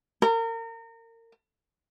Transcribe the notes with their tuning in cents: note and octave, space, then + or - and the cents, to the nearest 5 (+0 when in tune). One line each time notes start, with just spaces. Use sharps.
A#4 -30